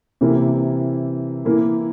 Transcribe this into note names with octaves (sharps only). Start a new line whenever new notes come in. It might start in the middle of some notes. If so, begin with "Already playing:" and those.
C3 E3 A#3 E4
E3 A#3 E4